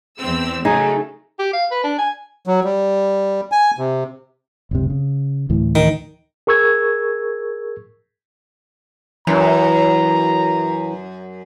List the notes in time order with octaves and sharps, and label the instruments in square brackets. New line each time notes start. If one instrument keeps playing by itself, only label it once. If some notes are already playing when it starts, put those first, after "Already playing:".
[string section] E2 C4 E6
[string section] C#3 F#3 A3 [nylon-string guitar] D#4 [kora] G#4
[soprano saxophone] G4
F5
B4
D4
G#5
[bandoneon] F#3
G3
G#5
C3
[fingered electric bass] F#1 C#2 C3
C#3
D2 A2 E3
[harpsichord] D#3
[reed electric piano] G#4 A#4 C#6 E6 G#6
[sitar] F#2 [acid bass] E3 [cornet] A#5